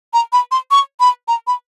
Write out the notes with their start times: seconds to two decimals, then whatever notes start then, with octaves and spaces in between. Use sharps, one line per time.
0.13 A#5
0.33 B5
0.51 C6
0.71 C#6
1.00 B5
1.28 A#5
1.47 B5